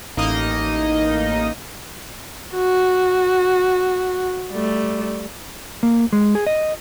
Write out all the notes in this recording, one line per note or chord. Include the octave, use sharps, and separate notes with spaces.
A1 A#3 D#4 D#5
F#4
G3 A3
A#3
G#3
G#4
D#5